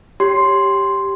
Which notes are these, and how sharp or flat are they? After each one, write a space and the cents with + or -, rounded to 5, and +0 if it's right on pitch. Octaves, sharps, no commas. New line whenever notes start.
G4 +0 C#5 +0 C6 +0